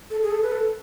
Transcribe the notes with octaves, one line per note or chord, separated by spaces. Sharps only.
A4
G#4
A4
B4
A4